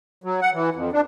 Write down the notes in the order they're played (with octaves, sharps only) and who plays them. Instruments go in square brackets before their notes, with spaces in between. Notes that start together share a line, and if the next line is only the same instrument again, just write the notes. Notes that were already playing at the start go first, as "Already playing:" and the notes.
[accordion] F#3
F#5
E3
F2
D4